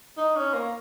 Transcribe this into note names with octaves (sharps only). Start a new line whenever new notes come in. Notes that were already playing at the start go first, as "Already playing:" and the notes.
D#4
C#4
A#3